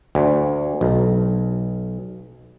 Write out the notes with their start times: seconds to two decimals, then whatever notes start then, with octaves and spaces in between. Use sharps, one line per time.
0.15 D2
0.81 B1